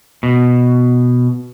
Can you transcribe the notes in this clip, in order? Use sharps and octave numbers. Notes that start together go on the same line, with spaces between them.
B2